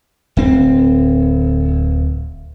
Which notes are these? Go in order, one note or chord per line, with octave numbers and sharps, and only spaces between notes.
D1 C4